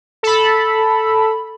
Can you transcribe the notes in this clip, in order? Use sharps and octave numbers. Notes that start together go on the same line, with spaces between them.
A4 B5